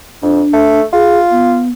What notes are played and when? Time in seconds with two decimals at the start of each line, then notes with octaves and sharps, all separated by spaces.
0.22 F2 D4
0.53 A3
0.93 F4 G#4
1.31 B3